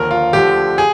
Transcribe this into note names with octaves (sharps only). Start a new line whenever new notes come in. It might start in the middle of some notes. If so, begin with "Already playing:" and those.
Already playing: D#2 D3 F3 A#4
F4
D2 D3 F3 G4
G#4